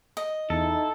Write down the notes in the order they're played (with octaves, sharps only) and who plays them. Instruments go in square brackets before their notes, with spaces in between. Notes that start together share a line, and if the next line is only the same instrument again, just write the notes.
[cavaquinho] D#5
[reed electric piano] E2 [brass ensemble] D#4 E4 [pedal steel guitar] A4